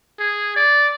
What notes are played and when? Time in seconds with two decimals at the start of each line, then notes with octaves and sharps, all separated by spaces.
0.20 G#4
0.56 D5